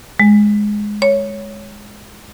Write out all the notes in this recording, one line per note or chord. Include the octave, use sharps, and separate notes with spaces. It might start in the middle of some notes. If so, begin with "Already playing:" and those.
G#3
C#5